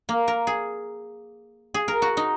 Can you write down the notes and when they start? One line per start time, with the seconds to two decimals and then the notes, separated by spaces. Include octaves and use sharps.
0.09 A#3
0.28 A#4
0.47 G#4
1.74 G#4
1.88 A#4
2.02 F#4
2.17 D#4